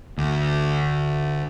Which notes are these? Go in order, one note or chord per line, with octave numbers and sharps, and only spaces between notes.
D2